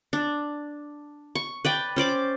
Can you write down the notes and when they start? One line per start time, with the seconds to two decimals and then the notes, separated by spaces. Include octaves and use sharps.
0.13 D4
1.35 C#6
1.65 B4 D5 G5
1.96 C#4 C5 D5 D6